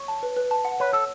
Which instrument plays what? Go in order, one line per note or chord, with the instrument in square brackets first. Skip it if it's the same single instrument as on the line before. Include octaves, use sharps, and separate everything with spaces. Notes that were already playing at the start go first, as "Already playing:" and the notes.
Already playing: [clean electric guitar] C#5
[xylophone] A5
B4
B4
A5
F#5
[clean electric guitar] B4 [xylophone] C#5
[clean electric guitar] A4 [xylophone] E6